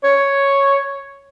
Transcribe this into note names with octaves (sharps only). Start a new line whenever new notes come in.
C#5